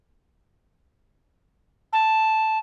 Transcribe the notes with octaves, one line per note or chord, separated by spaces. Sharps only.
A5